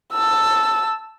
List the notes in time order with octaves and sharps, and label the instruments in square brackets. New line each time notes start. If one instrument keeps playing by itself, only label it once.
[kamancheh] A5 E6